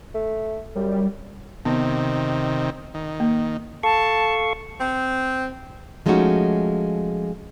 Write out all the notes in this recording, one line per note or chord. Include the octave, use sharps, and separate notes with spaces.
A3
F#2 G3
C3 D#3 B3
D#3
A#3
A4 F5 A5 C#6
C4
F3 G#3 A3 C#4 D#4 F#4